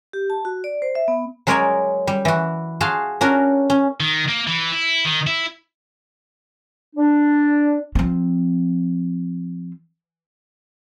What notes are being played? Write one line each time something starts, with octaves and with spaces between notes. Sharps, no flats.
G4
A5
F#4
D5
C5
E5
B3
F#3 G#3 A#4 C#5 D5 G#5
G3
E3 F#4
F#4 G#4 F5 A5 C6
C#4 D4 F#4 A#4
C#4
D#3
A#3
E3
E4
D#3
E4
D4
F3 C4